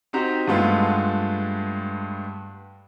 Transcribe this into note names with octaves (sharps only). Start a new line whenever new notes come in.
C4 D#4 F#4 G4 A#5
G2 G#3 A3 B3 F4